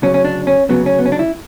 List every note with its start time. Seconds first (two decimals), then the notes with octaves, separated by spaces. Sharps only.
0.02 D2 C#3 F#3 C#4
0.14 C#4
0.25 D4
0.47 C#4
0.69 D2 C#3 F#3 B3
0.86 C#4
0.99 B3
1.06 C#4
1.12 D4
1.19 E4